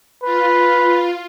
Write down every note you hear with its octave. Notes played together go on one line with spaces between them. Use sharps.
F4 B4